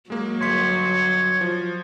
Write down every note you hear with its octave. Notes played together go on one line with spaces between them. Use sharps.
F#3 G#3 A#3
G1 C#5 C6 B6
F3